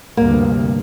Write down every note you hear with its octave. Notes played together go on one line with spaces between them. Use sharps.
D2 G2 C3 A#3